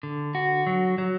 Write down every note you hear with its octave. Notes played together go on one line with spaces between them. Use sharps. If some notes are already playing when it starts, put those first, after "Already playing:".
D3
F#4
F#3
F#3